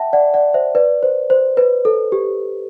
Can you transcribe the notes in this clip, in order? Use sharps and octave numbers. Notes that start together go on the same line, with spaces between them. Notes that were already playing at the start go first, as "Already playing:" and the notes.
Already playing: E5 F#5 G5 A5
D5 F#5
D5 F#5
C5 E5
B4 D5
C5
C5
B4
A4
G4